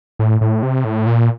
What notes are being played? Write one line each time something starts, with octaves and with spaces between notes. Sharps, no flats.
A2
A2
C3
A2
A#2